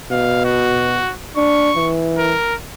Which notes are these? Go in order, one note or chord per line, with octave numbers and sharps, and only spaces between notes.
B2 F5
F#4
D4 C#6
E3
A#4